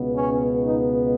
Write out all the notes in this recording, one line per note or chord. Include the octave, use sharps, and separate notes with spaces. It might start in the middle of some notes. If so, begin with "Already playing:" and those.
Already playing: C#2 B2 B3
C#4
D#4